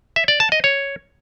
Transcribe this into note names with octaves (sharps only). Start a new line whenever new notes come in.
E5
D5
A5
D#5
C#5